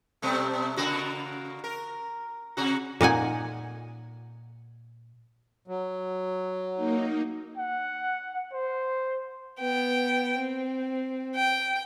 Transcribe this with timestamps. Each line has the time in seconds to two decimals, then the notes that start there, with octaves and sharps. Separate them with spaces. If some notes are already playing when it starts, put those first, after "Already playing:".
0.22 B2 G3 A3
0.77 C#3 A#3 F#4
1.64 A#4
2.57 C3 F#4
3.01 A#2 D#4 F#5 G#5
5.68 F#3
6.76 A#3 D#4
7.57 F#5
8.52 C5
9.59 B3 G5
10.39 C4
11.36 G5